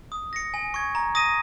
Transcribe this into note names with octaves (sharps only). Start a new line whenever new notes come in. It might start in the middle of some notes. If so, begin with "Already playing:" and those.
D#6
A#6 C#7
G#5
C#6 G#6
A#5
D#6 A#6 D#7